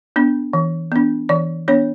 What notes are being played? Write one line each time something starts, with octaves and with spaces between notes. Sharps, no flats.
B3 D4
E3
B3 D4
E3 D5
B3 D4 C#5